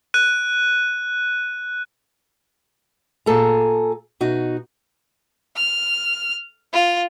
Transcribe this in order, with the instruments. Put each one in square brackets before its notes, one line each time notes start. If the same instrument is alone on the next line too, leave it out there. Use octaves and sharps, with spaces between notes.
[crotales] F#6 D#7
[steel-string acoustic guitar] A#2 G#4 A4 A5 A#5
B2 D#4 F#4
[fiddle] F6
F4